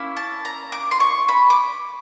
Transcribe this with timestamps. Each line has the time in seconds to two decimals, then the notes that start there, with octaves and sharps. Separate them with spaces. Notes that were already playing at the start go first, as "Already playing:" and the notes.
Already playing: A#3 C#4 E4
0.17 A5
0.45 A#5
0.72 D6
0.91 C6
1.00 C#6
1.28 B5
1.50 D6